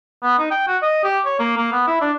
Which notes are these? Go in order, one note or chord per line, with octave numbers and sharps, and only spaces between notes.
B3
D#4
G5
F#4
D#5
G4
C#5
A#3
A#3
B3
E4
D4